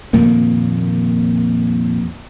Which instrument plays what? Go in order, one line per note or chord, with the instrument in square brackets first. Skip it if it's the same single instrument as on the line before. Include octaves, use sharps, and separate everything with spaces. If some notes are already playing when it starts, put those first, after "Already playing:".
[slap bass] F2 A#2 D#3 A#3